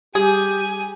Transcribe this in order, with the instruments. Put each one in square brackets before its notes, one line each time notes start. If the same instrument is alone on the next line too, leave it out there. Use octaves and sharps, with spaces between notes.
[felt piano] G3 [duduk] G4 [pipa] G#4 [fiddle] G#5